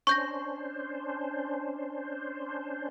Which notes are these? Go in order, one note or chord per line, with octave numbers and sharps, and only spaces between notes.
C#4 D4 C5 C#6 G6 A#6